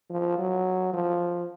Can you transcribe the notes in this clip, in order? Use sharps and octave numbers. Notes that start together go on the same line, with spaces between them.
F3
F#3
F3